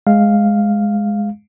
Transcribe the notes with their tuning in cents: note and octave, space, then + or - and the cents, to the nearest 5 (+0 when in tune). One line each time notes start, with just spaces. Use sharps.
G#3 +0 F5 +0